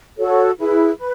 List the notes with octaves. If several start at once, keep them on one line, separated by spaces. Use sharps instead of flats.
F#4 A4 C#5
E4 G#4 B4
B4